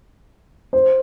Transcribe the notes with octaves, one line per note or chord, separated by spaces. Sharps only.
C5